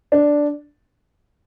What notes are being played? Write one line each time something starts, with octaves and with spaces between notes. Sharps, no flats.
D4